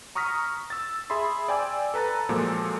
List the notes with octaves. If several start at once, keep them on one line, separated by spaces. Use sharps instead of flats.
A#5 C#6 D#6 F6 A#6 B6
E6 A6
G#4 E5 B5 C6
D5 G5 G#5 D6 E6
A4 B4 A#5 F#6 A6
A#2 F3 F#3 G#3 A#3 A4